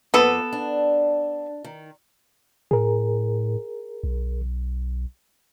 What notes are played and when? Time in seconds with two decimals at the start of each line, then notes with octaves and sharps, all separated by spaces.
0.14 F2 A#3 B3 A4 B4
0.53 D4
1.64 D#3
2.71 A2 G#4 A#4
4.03 B1